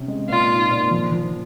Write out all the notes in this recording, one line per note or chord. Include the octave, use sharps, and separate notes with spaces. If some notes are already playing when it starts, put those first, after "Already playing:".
Already playing: C3 C#4
G#3
A#2 F4
D#4
A#2
F3
F3